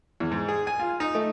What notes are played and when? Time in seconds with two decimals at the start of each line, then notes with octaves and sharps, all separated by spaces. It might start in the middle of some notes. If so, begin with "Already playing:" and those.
0.20 E2
0.31 G#2
0.48 G#4
0.67 G#5
0.79 F4
1.00 D#4
1.15 A3